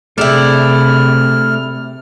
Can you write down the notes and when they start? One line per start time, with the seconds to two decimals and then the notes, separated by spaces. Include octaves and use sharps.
0.18 C3 A3 D4 E4 G#4 G5 F6